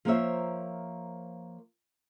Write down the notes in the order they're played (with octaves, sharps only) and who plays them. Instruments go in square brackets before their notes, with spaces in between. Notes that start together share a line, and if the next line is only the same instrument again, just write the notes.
[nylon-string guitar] F3 A#3 A#4 C5 C#5 E5